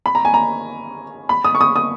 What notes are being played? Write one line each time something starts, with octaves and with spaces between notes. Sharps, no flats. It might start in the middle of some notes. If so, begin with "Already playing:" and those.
B5
A#5
G#5
A#5
B5
D#6
C#6
D#6
D#6